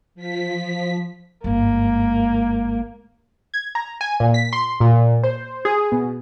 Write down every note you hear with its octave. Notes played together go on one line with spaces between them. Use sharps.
F3 B6
G1 G#2 A#3
G#6
A#5
G#5
A#2
B6
C6
A#2
C5
G#4
B2